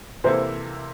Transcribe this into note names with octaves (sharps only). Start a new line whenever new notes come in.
C3 E3 A#3 E4 A4 C5